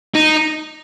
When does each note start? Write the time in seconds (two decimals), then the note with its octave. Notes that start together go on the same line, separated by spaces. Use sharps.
0.14 D#4